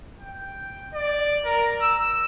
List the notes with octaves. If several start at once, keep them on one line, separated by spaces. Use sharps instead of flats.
G5
D5
A#4
E6